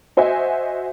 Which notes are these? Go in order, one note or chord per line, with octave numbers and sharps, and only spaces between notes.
F#4 C5 D#5 E5 G#5